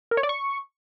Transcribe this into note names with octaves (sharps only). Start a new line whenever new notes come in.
A#4
C#5
D5
C#6